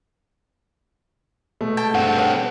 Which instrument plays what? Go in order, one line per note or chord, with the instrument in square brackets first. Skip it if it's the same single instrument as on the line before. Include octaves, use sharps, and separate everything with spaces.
[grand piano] B2 G#3 A3
[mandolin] G5 A5
[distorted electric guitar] G2 C4 [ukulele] F#5
[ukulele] B4 C#5 F#5